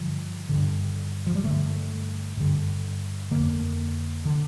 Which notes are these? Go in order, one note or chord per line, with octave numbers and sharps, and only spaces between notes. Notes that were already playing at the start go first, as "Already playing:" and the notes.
Already playing: G2 D3 F3
G2 D3
F3
G3
G2 D3 A3
G2 D3
F2 D3 A#3
D3